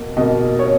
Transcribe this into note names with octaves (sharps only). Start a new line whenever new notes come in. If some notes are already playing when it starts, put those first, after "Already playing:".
Already playing: B2 A#3
B2 A#3 D#5
C#5